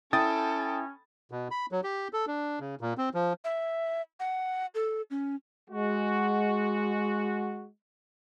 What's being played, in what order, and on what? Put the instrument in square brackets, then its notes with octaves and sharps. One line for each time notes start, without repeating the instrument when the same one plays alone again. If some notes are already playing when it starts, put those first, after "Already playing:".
[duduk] C#4 [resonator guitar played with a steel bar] E4 [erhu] A4 [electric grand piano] G5 D#6 A6
[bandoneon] B2
B5
F#3
G4
A4
D4
C#3
A#2
C4
F3
[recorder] E5
F#5
A4
C#4
[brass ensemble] G#3 F#4